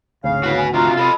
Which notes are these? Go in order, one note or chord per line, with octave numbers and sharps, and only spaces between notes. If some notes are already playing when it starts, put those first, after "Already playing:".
G#1 D2 C#3 F5
E4 F#4 B4
G#5
C3 D4 F4 F#4 A#5
C3 A4 D5 D#5 B5